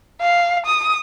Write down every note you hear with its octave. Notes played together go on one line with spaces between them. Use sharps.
F5
D#6